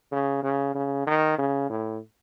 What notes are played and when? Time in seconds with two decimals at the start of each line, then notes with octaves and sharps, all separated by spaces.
0.12 C#3
0.43 C#3
0.75 C#3
1.06 D#3
1.38 C#3
1.70 A2